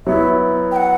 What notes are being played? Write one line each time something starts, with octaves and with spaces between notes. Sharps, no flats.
F#3 B3 E4 E5
G5
F#5